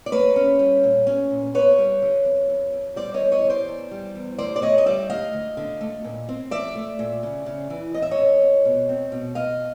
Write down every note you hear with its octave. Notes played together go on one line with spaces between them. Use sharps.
D5
A#3 B4 C#5
C#4
G3
A#2
C#4
A#2
B3 B4 C#5
G3
D3
F2
F2
F2
G3 C5 D5
C#5 D#5
E2
C#5 D#5
E2
C5 D5
E2
G3
E2
D2 C5 D5
D5
D2 C#5 D#5
D#5
G3 D5 E5
D2 D#5 F5
D2
D3
A3
A#2
C4
F3 D5 E5
A3
A#2
C#3
C#3
E3
F2 D#5
E5
C#5 D#5
F2
F2
B2
C4
B2
B2 D#5 F5